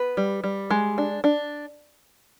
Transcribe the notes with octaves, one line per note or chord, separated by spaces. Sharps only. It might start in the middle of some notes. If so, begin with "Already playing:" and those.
Already playing: B3 B4
G3
G3
G#3
D4
D4